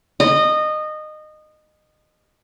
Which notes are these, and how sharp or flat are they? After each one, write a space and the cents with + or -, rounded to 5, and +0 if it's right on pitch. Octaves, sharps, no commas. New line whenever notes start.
D#5 -20